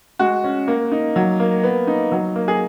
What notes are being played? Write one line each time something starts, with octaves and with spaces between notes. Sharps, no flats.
G#3 F#4
C#4
A#3
D#4
F#3
A#3
B3
D#4
F#3
A#3
G#4